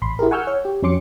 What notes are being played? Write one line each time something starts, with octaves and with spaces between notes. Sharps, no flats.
A1 B5 C6
E4 G4 G#4 A#4
F#5 G#5 C#6 E6 F6 G6
C#5
G4
F2 F#3 C#4 C6 D6 C#7